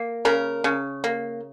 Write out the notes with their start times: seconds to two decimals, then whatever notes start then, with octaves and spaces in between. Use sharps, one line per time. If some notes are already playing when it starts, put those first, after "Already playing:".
Already playing: A#3
0.25 C#3 A#4
0.64 C#3
1.04 A#3